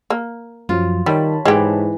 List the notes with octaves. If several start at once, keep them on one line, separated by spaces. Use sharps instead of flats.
A#3
F#2 F3 F#3 F4
D#3 G3 C#5 A5 B5
G#2 E3 G#3 G4